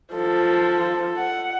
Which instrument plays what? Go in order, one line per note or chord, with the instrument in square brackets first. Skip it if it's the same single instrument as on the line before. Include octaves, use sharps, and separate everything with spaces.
[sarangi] F3 [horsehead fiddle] A4
[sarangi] F#5